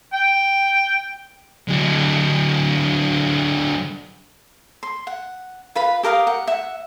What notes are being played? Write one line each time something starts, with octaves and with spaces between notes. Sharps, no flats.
G5
D3 F#3
C6
F#5
F4 B4 B5
G4 A#4 F5 D#6
F#5
E5 F#5